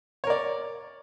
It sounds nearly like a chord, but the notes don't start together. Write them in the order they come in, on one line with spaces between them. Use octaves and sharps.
C#5 A#4 D5